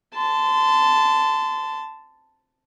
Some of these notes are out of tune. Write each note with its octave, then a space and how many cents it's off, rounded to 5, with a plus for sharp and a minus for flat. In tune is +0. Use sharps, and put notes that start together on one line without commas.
A5 +0 C6 -30